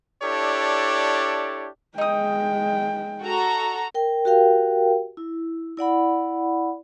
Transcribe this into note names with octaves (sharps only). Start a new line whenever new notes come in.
D4 E4 G4 A4 C#5 D5
G#3 D#4 G5 D#6
F#4 A4 A#5
A#4 G5
F#4 G4 A#4 F5 G5
E4
E4 D5 F#5 B5